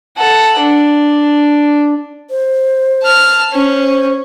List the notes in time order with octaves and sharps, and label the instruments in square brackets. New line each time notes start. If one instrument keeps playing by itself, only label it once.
[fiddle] A4 F#5
D4
[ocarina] C5
[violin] A5 F6
[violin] C#4 [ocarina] C5